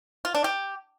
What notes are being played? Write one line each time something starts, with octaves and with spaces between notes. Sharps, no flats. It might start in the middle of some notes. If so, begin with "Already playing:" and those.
F4
D4
G4